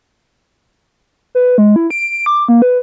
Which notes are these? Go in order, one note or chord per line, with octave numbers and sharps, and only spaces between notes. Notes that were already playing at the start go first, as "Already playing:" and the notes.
B4
G#3
E4
D7
D6
A#3
B4